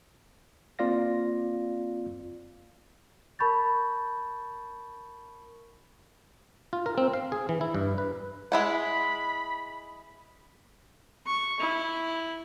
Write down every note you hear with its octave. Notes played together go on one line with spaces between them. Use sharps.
A#3 C4 F4 D5 F5 A#6
A#4 A5 B5 C#6 G6 A6
F4
A#4
C4
F5
G#4
E3
E4
G2
B4
G#3 E4 F#5 B5
C#6
E4